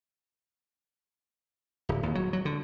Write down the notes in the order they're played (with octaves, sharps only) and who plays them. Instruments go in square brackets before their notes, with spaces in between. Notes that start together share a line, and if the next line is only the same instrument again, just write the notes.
[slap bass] D1
D#2
F#3
F#3
D3